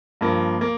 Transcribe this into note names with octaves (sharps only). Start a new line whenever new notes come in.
G2 F3 A#3
A#3